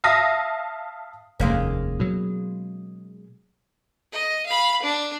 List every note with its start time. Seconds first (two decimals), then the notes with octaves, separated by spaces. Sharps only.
0.04 E5 F5 A5 D#6 A#6 B6
1.40 F1 D#2 G#3 A#3 C#4
2.00 B2 F#3
4.12 D#5
4.46 F5 B5
4.82 D4